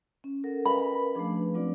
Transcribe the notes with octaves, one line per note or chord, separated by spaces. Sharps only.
C#4
A4 A#4 F#5
A#4 B4 D#5 F5 G#5 B5
F3 A3 D4 G#4
B4
F#3 C4 D4 F4 D5